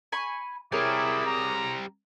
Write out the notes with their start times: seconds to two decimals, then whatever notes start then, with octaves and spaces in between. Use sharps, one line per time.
0.12 G#5 B5 C#6
0.72 G3 C4 E4 G#4 A#4 C#5 D6 D#6
1.26 A#5